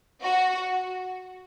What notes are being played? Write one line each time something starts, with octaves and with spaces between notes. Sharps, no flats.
F#4